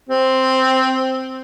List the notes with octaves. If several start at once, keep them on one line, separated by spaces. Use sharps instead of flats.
C4